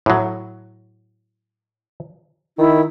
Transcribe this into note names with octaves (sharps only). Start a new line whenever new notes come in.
A2 F#3
D#3 E4